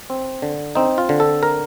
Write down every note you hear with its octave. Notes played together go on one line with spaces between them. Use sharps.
C4
D3
C4 D#4
F4
D3
A4
A#4